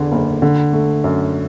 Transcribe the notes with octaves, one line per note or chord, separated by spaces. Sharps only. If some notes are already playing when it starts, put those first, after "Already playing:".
Already playing: E2 D3
F#1
D3
A3
F#2